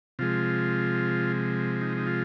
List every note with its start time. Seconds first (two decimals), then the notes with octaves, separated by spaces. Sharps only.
0.19 C3 F3 G#3 F4
1.81 D#4
1.97 D#4
2.07 F4